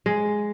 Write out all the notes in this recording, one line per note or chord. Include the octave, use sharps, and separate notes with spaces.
G#3